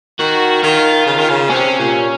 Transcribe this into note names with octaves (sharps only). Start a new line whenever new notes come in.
D#3 F#4
D#3 F4
C#3
D#3
C#3
C3 C#4
A#2